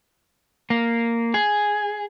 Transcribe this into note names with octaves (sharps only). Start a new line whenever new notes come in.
A#3
G#4